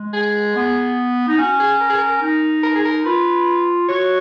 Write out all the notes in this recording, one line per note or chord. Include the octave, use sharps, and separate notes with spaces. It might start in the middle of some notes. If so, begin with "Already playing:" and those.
Already playing: G#3
G#4
B3
D#4
C#4 F#4
G#4
A#4
G#4
A#4
D#4
A#4
G#4
A#4
F4 B4
F#4 C#5